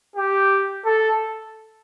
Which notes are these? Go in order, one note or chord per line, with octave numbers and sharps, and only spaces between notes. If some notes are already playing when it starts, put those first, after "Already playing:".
G4
A4